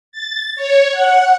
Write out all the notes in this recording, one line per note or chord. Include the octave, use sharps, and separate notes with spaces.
A6
C#5
F#5